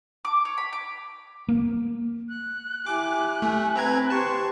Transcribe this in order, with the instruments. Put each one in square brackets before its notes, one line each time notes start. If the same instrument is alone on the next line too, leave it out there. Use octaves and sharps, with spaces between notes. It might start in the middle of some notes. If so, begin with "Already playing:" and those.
[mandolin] D6
C#5
B5
D6
[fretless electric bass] A#3
[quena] F#6
[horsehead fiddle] E4 G4 [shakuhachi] G#5 [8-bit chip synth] D6
[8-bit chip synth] A3
[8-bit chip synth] C4 A#5 G#6 [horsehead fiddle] B4
[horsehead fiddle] G4 C5 [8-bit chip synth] A5 C#6